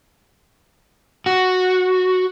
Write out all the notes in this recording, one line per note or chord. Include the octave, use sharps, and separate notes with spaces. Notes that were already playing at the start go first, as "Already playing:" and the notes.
F#4